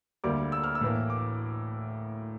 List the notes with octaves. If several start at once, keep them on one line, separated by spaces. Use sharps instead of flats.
D2 D3 G3 A#3 D6
E6
F6
E6
A2 E3 A#3
D6